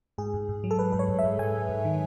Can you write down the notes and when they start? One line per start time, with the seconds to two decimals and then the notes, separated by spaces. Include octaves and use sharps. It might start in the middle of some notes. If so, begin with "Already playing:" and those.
0.18 G#2 G#4
0.34 G#2
0.49 G#2
0.64 F#3
0.71 A4
0.79 G#2 B4
0.92 G#2 B4
0.99 C#5
1.08 G#2
1.19 E5
1.24 G#2
1.39 G#2 G#5
1.54 G#2
1.69 G#2
1.85 D#3